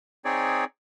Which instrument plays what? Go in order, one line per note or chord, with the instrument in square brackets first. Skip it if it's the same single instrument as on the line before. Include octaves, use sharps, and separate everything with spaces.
[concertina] C4 D#4 G#4 C#5 D5